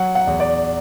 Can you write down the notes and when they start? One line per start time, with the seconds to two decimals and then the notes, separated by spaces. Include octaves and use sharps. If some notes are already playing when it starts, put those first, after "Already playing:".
Already playing: F#3 F#5
0.15 F#5
0.27 E2
0.40 D5